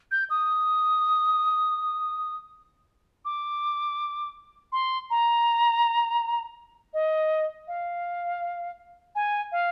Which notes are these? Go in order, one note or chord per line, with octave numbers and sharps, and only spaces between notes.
G6
D#6
D6
C6
A#5
D#5
F5
G#5
F5